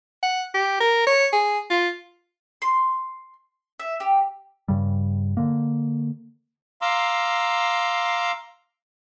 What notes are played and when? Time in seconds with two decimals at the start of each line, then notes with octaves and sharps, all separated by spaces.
0.23 F#5
0.54 G4
0.80 A#4
1.07 C#5
1.33 G#4
1.70 F4
2.62 C6
3.80 E5
4.00 G4
4.68 G2 C#3 G3
5.37 D3 A#3
6.82 F5 A#5 C6 D6 E6